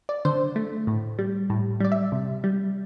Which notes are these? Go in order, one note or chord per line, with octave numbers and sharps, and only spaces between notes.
D5
D3 C5
A3
A2
G3
A2
G3 D5
E5
C3
G3